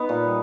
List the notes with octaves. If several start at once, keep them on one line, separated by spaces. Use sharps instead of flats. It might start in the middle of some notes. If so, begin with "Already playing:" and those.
Already playing: B3 D#4
A#2
G3